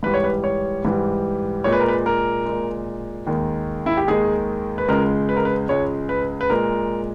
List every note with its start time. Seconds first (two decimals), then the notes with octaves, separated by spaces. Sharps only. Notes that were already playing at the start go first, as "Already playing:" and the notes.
0.03 G#2 E3 G3 B4
0.14 C#5
0.24 B4
0.44 C#5
0.85 G#2 E3 G3
1.64 A#2 G#3 C#5
1.73 B4
1.80 A#4
1.88 B4
2.06 A#4
2.46 A#2 G#3
3.27 D#2 D#3 G#3
3.86 E4
3.97 G4
4.07 D#2 D#3 G#3 G#4
4.78 B4
4.88 C#2 C#3 G#3 A#4
5.29 B4
5.36 A#4
5.45 B4
5.69 C#2 C#3 G#3 C#5
6.09 B4
6.41 B4
6.50 A#2 G#3 A#4